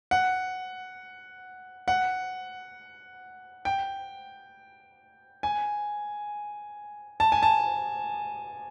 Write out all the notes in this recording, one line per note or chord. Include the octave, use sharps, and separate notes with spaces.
F#5
F#5
G5
G#5
A5
G#5
A5